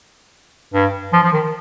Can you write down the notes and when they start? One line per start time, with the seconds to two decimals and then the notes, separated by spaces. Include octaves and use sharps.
0.74 G2
1.13 F3
1.23 F3
1.33 D#3